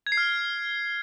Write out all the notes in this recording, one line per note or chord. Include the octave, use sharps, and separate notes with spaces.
G#6
C7
F6
C7